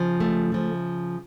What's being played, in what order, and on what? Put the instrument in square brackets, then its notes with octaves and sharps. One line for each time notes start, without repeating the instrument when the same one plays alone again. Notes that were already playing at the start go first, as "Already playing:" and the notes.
Already playing: [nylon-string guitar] C#3 F3
A3
C#3 F3